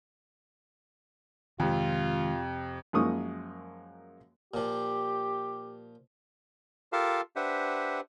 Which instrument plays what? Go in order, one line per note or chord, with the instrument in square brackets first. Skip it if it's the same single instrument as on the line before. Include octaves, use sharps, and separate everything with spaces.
[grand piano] F2 C3 [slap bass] D#3 G#3 [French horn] F4
[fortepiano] F#2 F3 G#3 A#3 C#6 D#6
[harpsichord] A#2 F3 [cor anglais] G4
[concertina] F4 G4 A4 A#4 F5 A5
D4 G4 B4 C5 E5 F#5